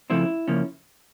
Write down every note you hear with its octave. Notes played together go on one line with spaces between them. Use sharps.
C#3 F3 A3 C4 E4
C#3 F3 A#3 C#4